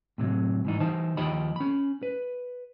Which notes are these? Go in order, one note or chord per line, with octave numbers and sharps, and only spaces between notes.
A2 C3 E3 F#3
G#2 E3 D#4
E3 D#4 C5 A5
D#2 F3 G4 D#5 B5
C#4 B5
B4